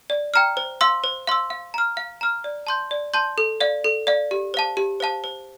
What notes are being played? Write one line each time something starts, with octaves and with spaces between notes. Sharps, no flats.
D5
G5 A#5 F6
C5
F5 C6 E6
C5
F5 C6 E6
F5
A#5 F6
F5
A#5 F6
D5
A5 C6 G6
D5
A5 C6 G6
A4
D5 F5
A4
D5 F5
G4
C5 F5 A5
G4
C5 F5 A5
C5